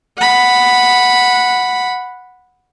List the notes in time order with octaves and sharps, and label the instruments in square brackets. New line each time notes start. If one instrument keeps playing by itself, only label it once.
[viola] F#5 B5